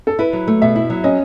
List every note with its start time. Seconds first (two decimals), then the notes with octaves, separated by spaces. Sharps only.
0.07 A4
0.19 E4 B4
0.33 F#3
0.47 A3
0.62 B2 E5
0.76 E4
0.90 F#3
1.04 C#4 D#5